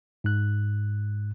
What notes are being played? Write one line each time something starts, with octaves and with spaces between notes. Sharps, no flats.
G#2 F#6